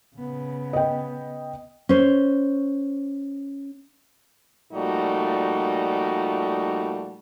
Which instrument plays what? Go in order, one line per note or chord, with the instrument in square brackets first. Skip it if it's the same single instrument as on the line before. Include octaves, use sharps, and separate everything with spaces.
[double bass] C#3 B3
[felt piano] D#5 G5
[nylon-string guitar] C#4 C5
[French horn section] A#2 F3 G3 A3 D#4 F#4